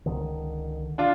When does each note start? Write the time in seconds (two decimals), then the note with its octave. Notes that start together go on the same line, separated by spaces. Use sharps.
0.06 C#2 D3 D#3
0.98 D4 F4